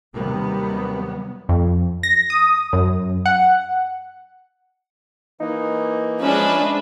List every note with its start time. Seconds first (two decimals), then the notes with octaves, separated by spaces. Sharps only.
0.14 D#2 C3 D#3 F#3 G3 B3
1.49 F2
2.03 A#6
2.30 D#6
2.73 F#2
3.26 F#5
5.41 E3 A#3 D#4
6.21 F3 G#3 C#4 D4 B4 E5